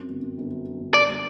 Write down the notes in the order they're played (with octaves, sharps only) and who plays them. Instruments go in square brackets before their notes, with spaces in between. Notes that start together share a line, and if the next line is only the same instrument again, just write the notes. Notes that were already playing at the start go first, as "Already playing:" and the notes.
Already playing: [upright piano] F#2 C4
G1
F#2
G1
F#3
F#3
G1
[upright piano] D4 [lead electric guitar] D5
[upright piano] G3